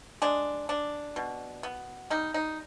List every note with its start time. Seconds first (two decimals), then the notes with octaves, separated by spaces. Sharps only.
0.22 G#3 D4
0.69 D4
1.16 B2
1.63 B3
2.10 G3 D#4
2.34 D#4